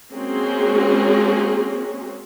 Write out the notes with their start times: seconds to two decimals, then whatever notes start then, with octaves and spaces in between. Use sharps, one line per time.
0.14 G#3 A#3 C4 C#4 F#4 G#4